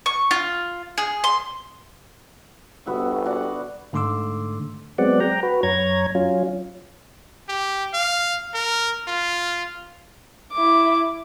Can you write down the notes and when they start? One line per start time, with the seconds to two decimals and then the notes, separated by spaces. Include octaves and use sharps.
0.06 C#6
0.31 F4
0.98 G#4
1.24 C6
2.86 G1 B3 F#4 E5
3.26 F#4 D5 F#5
3.93 G#2 D3 A3 C6 D6 E6
4.98 F#3 G#3 B3 C4 D5 F#5
5.20 G5 A#5
5.43 F#4 B4
5.63 F#2 C#5 A#5 G#6
6.15 F#3 C#4 F4
7.49 G4
7.94 F5
8.55 A#4
9.08 F4
10.53 E4 D6